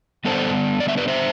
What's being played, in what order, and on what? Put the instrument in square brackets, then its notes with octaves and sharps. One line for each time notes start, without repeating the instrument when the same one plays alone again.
[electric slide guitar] D3 G3 B3 D4 A4 C5
D5
E5
B4 D5
C5 E5